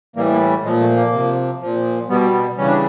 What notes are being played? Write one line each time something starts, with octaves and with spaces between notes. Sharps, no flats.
A2 E3 G3 A#3
A#3
A#2 F3 G#3
A3
A#3
C3 F3
A#2 F3
B2 G3 B3
B3
C#3 E3 G3 C#4
D4